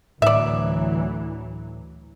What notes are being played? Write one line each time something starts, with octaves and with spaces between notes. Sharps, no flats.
D2 A2 E3 F#3 D5 E5